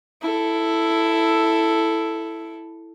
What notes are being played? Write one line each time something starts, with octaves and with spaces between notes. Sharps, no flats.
E4 A4